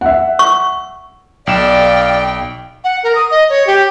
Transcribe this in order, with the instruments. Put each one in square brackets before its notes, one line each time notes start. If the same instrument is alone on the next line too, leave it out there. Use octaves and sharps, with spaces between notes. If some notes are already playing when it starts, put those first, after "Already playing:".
[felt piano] E5 F#5
[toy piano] C#6
[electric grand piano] B1 E7 [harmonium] D5 F5 [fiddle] G5
[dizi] F#5
A#4
D#6
D#5
C#5
G4